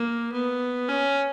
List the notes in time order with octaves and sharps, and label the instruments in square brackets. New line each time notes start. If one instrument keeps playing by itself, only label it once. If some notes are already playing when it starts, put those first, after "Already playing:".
Already playing: [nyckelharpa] A#3
B3
C#4